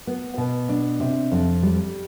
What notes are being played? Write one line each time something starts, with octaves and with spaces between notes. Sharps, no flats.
B3
B2
D4
C3
F2
G3